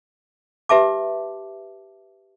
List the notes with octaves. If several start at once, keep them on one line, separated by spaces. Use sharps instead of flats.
G4 B4 E5 A5 D6